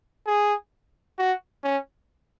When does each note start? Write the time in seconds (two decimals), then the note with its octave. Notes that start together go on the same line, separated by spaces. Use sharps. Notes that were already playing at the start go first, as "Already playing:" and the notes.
0.27 G#4
1.18 F#4
1.64 C#4